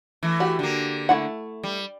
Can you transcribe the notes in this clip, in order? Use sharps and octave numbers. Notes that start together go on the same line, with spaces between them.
E3 A3
F#4 G4
D3 A#3
A3 E4 F#5
G3